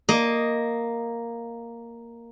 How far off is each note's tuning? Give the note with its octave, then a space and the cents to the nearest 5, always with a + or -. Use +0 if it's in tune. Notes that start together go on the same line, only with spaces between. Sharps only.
A#3 +0 D#5 +0